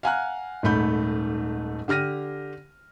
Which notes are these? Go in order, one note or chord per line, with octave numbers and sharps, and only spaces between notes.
F5 F#5 G#5 A#5 F6 F#6
D#1 G#2 A3 B5 G6
D3 G4 F6 A#6 D#7